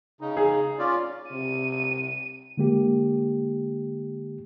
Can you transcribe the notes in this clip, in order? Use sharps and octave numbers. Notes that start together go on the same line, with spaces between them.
C#3 D#4
G#4
C#4 F4 D5
C3 D#7
D3 G#3 A#3 G4